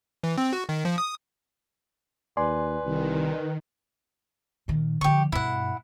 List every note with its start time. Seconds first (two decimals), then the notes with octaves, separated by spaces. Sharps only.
0.23 E3
0.38 C4
0.53 F#4
0.69 D#3
0.85 F3
0.98 D#6
2.37 D#2 B4 D5 G#5 C6
2.84 C2 D#3
4.68 A#2 D#3
5.01 D3 F3 G4 C#6
5.32 G2 B2 E4 F#5